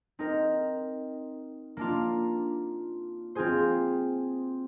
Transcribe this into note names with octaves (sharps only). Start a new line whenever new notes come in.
C4 D#4 A#4
A#3 D4 F4
C4 F4 G#4 C5